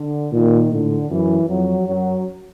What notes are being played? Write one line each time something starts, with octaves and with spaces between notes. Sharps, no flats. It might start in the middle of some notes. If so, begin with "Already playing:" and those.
Already playing: D3
A#2 D#3
A2 D3
F#2 E3
F2 F#3
F#2 F#3